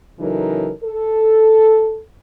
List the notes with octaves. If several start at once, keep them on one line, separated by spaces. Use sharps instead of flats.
C#3 E3 F#3 D#4 A4 A#4
A4